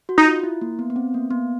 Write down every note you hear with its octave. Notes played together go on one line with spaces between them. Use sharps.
F#4
D#4
F4
E4
A#3
B3
B3
C4
A#3
B3